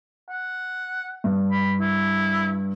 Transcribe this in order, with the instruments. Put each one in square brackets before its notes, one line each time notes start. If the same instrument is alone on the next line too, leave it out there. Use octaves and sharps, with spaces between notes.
[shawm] F#5
[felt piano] G2
[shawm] B5
E4